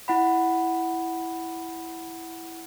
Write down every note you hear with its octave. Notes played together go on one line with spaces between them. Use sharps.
E4 F#5 B5